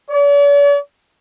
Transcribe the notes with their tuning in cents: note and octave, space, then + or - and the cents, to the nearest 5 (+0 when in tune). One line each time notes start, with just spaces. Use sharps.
D5 -45